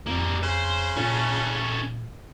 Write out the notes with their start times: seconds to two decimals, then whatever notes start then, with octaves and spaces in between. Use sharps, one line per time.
0.06 F2 G3 A#3
0.43 C#3 C5
0.96 A#2 C#4 A4